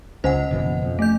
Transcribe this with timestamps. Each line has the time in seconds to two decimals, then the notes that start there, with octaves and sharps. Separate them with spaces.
0.24 C#2 C#4 C5 D#5 F#5 G#5
0.51 F#1 B2 E3
0.83 F2
0.99 A3 G6